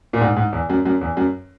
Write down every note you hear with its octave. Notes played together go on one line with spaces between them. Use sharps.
A#2
G#2
G#2
E2
F#2
F#2
E2
F#2